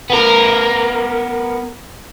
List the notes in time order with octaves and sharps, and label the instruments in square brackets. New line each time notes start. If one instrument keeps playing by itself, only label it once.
[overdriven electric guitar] B3 A#4